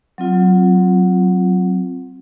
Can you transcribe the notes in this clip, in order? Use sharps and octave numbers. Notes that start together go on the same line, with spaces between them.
F#3 C4 F4